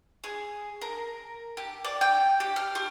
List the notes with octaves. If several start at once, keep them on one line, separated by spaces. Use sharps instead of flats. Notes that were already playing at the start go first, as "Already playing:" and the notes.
G#4
A#4
G4
D5
G5
G4
F6
G4